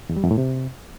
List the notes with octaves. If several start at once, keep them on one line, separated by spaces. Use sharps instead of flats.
E2
G3
F2
A2
C3